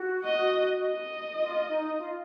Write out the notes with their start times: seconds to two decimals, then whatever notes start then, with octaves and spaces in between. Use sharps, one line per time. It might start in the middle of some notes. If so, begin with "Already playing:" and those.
Already playing: F#4
0.25 D#5
0.82 D#5
1.40 F4
1.69 D#4
1.98 F4